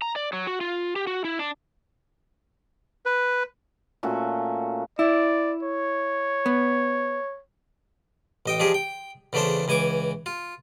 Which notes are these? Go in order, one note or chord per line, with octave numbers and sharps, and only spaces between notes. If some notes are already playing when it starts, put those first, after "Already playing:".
A#5
D5
F#3
F#4
F4
G4
F#4
E4
D4
B4
A#2 A3 C#4 F#4
E4 D5
C#5
B3
A1 D#5 G5
F3 D4 D#4 G4 G#4
G5
E2 C#3 A3 D4 A4 C5
C#2 E3 G#5 C#6 D6
F4